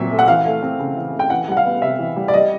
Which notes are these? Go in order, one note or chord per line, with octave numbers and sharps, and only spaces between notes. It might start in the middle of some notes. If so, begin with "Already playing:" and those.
Already playing: A#2 F#3 C4 E5
A3
F#5
E3 F5
A3
C4
C#3
E3
A3
G5
E3 F#5
G3 F#5
F5
B3
C3 E5
E3
G3
D5
G3 D#5